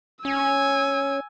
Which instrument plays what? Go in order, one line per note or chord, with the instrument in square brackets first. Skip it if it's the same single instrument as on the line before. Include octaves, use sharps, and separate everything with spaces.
[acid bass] C#4 [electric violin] G#5 E6